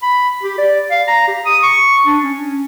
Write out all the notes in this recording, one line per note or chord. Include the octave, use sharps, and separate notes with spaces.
B5
G4
D5
F5
A#5
G4
D#6
C#6
D4
C#4